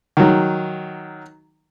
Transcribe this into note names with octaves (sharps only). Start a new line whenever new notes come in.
D#3 F#3